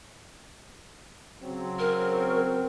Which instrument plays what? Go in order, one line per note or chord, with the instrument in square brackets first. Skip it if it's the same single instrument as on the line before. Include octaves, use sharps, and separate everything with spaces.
[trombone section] C#3 F#3 C4
[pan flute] A#4